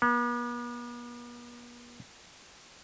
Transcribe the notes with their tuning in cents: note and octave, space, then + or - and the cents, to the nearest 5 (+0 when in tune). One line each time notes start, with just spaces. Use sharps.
B3 -45